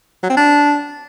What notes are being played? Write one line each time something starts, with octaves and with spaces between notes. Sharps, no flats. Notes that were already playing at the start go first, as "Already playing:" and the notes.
F#3
C4
D4